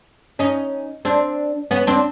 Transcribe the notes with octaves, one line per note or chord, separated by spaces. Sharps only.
C#4 D#4
C4 D4
B3 C#4
C4 D4